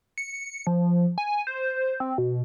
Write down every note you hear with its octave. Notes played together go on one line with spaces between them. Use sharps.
C#7
F3
G#5
C5
C4
B2